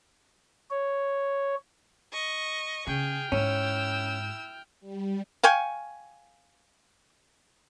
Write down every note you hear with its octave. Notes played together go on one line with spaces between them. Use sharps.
C#5
D#5 C#6
C#3 G#4 G5 F6
G#2 C#4 E4 E6
G3
F5 G5 G#5 C#6